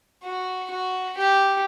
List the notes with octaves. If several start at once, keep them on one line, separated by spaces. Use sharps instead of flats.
F#4
F#4
G4